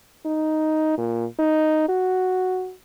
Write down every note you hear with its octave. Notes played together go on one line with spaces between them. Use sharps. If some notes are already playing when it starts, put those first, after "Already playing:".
D#4
A#2
D#4
F#4